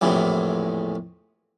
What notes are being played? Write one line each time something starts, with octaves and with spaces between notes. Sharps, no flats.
A#1 E2 A2 C3